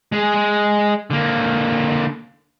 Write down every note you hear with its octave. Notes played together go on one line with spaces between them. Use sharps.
G#3 G#4
G#3
D3 A#3